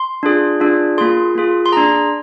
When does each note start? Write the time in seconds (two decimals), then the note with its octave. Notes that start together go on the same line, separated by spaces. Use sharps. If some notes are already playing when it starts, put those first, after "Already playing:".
Already playing: C6
0.23 D4 F4 G#4
0.60 D4 F4 G#4
0.98 A#3 F4 G#4 C6
1.35 A#3 F4 G#4
1.66 C6
1.72 D4 G#4 A#5